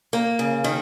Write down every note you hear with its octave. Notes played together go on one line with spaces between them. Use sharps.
A#3
C#3
D#3